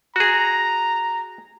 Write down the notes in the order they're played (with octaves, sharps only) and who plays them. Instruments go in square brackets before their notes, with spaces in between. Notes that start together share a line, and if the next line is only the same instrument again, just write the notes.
[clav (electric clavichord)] F#4 G#4 [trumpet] A#5